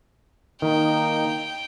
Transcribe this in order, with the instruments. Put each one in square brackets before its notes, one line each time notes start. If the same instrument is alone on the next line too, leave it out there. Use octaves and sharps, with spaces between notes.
[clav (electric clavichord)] D#3 [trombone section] A#3 D#4 [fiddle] G5